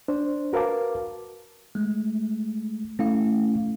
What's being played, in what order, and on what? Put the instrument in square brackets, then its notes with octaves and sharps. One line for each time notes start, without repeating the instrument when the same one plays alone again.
[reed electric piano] D4 C5
F#4 A#4 B4 F5 A5 D6
[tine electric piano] G#3 A3
[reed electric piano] A3 [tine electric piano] C#4 E4 F5